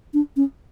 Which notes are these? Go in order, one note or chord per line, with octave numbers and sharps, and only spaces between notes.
D4
C#4